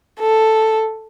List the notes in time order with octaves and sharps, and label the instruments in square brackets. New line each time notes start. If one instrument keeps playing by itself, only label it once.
[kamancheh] A4